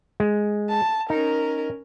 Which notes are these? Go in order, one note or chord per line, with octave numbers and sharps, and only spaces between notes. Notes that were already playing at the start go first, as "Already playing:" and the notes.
G#3
A5
C#4 D#4 A#4